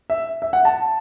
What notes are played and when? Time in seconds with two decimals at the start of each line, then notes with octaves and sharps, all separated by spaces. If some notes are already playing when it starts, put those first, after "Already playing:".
0.10 E5
0.42 E5
0.53 F#5
0.65 A5